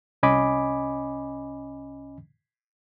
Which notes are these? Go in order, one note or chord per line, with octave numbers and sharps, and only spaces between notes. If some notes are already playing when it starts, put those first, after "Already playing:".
C2 C#4 D#5 G#5 B5 D6